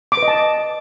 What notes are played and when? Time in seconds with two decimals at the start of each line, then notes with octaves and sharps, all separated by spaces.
0.12 D6
0.17 B4
0.23 D#5
0.28 A5